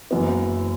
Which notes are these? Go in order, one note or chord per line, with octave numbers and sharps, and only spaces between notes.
F#1 F#2 E3 B3